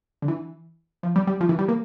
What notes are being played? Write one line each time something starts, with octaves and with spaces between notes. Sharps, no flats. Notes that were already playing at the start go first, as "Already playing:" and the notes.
D3
E3
F3
G3
G3
F3
E3
G3
A#3